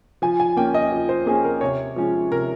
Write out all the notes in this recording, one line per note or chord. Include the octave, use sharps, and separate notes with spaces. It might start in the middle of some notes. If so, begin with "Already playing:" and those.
F3 G#5
G#5
A#3 C#4 G5
D#5
F3
C5
A#3 C#4 G#4
A#4
C3 C#5
F3 G#3 C#4
C3 A#4